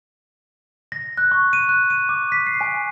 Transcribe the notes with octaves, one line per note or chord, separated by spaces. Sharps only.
A#6
F#6
C#6
D#7
F#6
D#7
D6
B6
C7
G#5